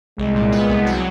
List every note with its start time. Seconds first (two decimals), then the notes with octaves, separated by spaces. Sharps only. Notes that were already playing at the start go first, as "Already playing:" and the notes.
0.18 C2 G#3
0.35 A#2
0.52 B3
0.69 C2
0.86 F#3